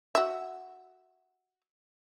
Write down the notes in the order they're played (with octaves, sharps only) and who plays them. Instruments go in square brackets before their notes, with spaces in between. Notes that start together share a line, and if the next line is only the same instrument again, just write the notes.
[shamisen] F#4 E5